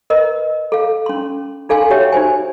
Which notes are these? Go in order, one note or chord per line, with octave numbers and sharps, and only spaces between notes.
A#4 B4 D#5
A4 F5
C#4 C6
D#4 A4 F5 G#5 C6
F#4 G4 C#5 E5 G5
D#4 F#4 C5 G#5